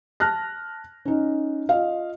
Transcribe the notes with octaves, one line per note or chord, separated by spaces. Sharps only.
A5 F6 F#6 A#6
C#4 D#4
F4 D#5 F5